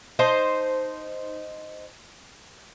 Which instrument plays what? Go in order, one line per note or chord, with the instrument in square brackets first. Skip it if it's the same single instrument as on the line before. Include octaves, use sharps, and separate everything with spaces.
[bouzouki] D#4 C5 A5